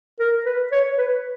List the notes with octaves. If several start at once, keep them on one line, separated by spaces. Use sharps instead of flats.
A#4
B4
C#5
B4